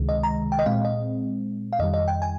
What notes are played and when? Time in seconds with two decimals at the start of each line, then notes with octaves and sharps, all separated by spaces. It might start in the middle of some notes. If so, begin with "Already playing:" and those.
Already playing: C#2 C3 D#3 G#3
0.09 D#5
0.23 A#5
0.52 G5
0.59 D#5
0.66 A#2 G#3 C4 F5
0.85 D#5
1.73 F5
1.79 F2 D#3 G3 D#5
1.94 D#5
2.08 G5
2.22 G#5